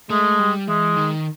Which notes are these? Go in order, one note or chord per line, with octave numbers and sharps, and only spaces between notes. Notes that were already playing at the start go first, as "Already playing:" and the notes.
G#3 A3
G3
E3 G#3
D#3